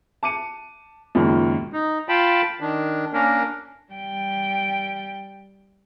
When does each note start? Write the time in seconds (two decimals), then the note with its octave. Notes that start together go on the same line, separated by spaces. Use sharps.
0.23 A5 D6 C#7 D#7
1.15 C#2 F#2 A#2 D#3
1.73 D#4
2.09 F4 G5 A5 B5
2.61 D#3 D4
3.13 A#3 C#4 D4 A#4
3.92 G3 G5